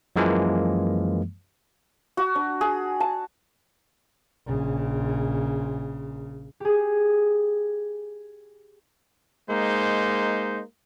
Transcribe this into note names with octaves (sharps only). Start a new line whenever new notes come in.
F#2 E3 F3 G#3 A#3
F#4
D4
G#4
A5
A#1 C#3
G4 G#4
G#3 A#3 D#4 C5